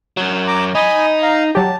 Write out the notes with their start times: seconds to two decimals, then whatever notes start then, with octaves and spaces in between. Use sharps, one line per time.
0.17 F#2 F#3
0.47 A#5 D6
0.75 D#4 D#5 G#5 B5
1.22 F5 A#5
1.55 F#3 G4 A5